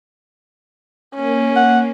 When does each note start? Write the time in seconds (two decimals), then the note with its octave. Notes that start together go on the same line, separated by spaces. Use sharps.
1.15 A#3 C#4
1.56 F#5